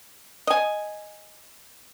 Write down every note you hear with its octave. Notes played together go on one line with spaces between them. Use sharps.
D#5 G#5